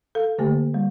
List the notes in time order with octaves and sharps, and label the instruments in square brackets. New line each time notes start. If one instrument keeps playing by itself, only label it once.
[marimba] A4 F5
D3 A3 A#3 G4
G3